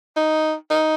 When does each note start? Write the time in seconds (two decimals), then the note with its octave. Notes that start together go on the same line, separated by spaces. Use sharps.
0.17 D#4
0.70 D#4